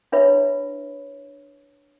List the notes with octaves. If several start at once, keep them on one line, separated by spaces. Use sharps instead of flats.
D4 E4 B4 C#5 E5 B5